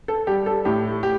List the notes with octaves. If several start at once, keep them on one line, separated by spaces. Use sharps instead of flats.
A4
G3 G4
A4
A2 G4
G4